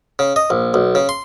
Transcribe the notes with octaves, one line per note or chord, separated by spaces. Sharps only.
C#3
D#5
A#1
B1
C#3
C6